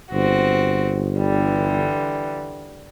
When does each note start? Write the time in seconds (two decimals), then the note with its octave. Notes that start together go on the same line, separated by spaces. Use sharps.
0.12 G1 C4 F#4
1.18 D3 E3 G3